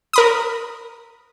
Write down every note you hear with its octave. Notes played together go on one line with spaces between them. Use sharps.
A#4 B5 D#6